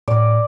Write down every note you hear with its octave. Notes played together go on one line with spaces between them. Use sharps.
A2 D5